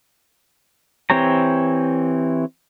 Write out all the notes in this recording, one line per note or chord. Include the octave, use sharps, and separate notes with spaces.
E3 C4 G4 C#5 A#5